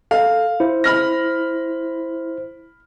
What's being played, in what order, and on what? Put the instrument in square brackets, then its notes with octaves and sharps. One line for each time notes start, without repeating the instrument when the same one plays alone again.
[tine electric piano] A4 [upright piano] F5
[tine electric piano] E4 C5
[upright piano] B5 F6 A#6